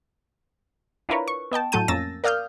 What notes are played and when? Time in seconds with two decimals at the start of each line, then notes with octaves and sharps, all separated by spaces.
1.09 D4 E4 F4 A#4 B4 C#5
1.28 C#6
1.52 B3 D#5 G5 A5
1.72 A2 F#3 A3 A5 G6 D#7
1.88 F2 A#3 C#4 E6 A6 A#6
2.24 A#4 D5 F5 D#6 F6 G6